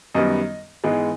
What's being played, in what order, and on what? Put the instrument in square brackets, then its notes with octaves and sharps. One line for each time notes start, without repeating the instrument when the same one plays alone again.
[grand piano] F#2 D#3 G3 B3 D#5
G#2 E3 G#3 B3